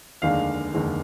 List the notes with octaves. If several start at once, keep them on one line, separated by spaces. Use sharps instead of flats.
F1 D#2 D3 G#3 D4 F5
F1 D#2 D3 G#3 D4